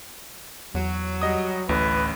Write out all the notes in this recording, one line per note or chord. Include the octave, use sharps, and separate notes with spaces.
E2 F#3
G3 D#5 D#6
A1 D2 A2 B4